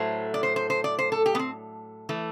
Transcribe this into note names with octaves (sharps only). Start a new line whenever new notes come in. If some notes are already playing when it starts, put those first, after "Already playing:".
Already playing: A2 F#3 A3 C5
D5
C5
C5
C5
D5
C5
A4
G4
B3
C4
E3 A3